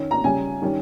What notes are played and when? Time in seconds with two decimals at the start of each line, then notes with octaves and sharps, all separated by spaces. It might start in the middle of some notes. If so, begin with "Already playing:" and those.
Already playing: D#3 C#4
0.11 A#5
0.24 C#3 G3 C#4 G#5
0.62 D#3 G3 C#4